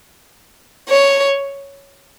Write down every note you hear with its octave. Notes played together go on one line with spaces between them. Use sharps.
C#5